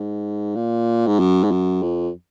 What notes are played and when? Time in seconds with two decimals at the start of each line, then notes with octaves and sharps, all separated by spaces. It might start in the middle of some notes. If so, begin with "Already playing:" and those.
Already playing: G#2
0.55 A#2
1.07 G#2
1.19 F#2
1.44 G#2
1.51 F#2
1.83 F2